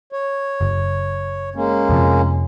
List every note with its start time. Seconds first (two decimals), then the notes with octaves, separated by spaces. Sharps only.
0.12 C#5
0.61 F#1
1.56 G#3 A#3 C#4
1.89 F2 C3 F3